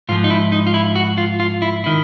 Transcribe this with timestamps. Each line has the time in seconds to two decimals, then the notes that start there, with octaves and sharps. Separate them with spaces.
0.09 G#2 F4
0.12 F3
0.24 D#4
0.30 E4
0.52 D#4
0.67 F4
0.74 E4
0.96 F#4
1.18 F4
1.40 F4
1.62 E4
1.84 D#3 E4